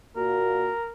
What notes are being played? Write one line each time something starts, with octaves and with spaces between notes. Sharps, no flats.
A#2 A#3 F#4 A#4